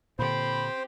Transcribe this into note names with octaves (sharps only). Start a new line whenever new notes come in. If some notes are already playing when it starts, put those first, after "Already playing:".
A#2 D3 C4 G4 C5 B5